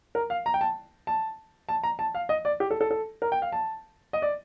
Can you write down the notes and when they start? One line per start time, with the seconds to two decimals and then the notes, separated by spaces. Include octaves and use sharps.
0.15 A#4
0.30 F5
0.46 A#5
0.54 G5
0.61 A5
1.07 A5
1.69 A5
1.83 A#5
1.99 A5
2.15 F5
2.29 D#5
2.45 D5
2.60 G4
2.71 A4
2.81 A4
2.91 A4
3.22 A#4
3.32 G5
3.42 F5
3.52 A5
4.13 D#5
4.22 D5